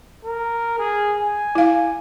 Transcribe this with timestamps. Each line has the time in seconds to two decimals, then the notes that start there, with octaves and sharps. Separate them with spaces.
0.25 A#4
0.78 G#4
1.19 G#5
1.55 E4 F5